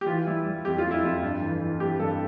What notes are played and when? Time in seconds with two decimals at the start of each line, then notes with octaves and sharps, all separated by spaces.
0.01 G4
0.07 E3 F4
0.27 G3 E4
0.46 G3
0.65 F2 G4
0.78 F4
0.84 F2
0.91 E4
1.03 F2 F4
1.22 G2
1.41 E3
1.61 E3
1.80 E3 G4
1.99 G2 A4